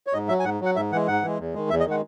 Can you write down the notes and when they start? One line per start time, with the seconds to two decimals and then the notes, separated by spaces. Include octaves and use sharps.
0.07 C#5
0.13 G#2 D#5
0.28 F#3 E5
0.40 G#5
0.44 G#2 F#5
0.61 F#3 F#5
0.76 G#2 E5
0.92 E3 F#5
0.95 G#3
1.07 G#2 F#5
1.22 E3 G#3
1.39 E2
1.54 D#3 G#3
1.70 E2 E5
1.80 D#5
1.86 D#3 G#3 F#5